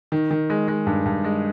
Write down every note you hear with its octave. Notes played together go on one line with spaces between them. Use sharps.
D#3
D#3
G#3
G#3
G2
G2
G#3